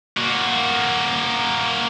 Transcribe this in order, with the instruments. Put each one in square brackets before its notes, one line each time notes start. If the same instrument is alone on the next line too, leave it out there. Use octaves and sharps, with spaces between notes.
[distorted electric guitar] A#3 F#4